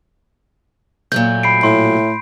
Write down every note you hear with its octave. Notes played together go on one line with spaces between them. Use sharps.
A#2 F#3 A3 G6
B5 C7 D7
A2 C6